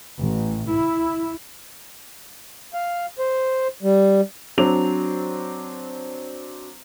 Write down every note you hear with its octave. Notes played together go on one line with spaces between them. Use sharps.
A1
E4
F5
C5
G3
F#3 C4 D4 F7